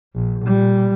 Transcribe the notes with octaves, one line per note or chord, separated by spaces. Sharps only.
A#1
A#2 G3